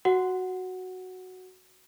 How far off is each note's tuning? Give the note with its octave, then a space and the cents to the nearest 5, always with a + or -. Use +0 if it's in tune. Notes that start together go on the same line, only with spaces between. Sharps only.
F#4 +0 F#5 +0